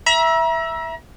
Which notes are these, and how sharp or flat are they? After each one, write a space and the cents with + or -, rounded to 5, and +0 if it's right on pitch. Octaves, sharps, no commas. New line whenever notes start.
E5 +0 A#5 +40